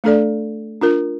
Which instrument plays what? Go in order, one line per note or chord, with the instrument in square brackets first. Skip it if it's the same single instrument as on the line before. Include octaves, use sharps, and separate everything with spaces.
[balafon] A3 D4 A4 D5
D4 F4 A#4